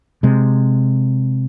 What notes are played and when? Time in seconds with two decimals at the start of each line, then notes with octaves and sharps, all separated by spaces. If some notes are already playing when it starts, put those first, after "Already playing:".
0.23 C3 G#3